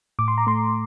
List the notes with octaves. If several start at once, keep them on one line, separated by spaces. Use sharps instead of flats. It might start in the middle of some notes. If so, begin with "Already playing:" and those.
A2 D6
C6
A#5
A3 C6